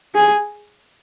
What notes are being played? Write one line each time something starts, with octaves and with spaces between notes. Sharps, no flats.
G#4